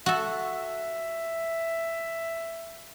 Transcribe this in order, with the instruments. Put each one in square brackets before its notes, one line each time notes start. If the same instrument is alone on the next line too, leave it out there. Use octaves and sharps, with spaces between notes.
[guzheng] F#4 A4 [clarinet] E5